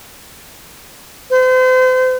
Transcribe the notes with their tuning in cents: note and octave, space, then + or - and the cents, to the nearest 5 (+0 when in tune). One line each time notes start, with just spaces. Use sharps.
C5 -40